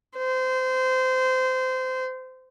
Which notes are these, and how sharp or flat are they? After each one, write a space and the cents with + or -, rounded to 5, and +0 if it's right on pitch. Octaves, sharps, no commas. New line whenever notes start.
C5 -25